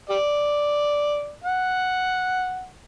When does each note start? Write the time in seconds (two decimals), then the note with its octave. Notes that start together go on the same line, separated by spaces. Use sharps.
0.10 G4 D5
1.44 F#5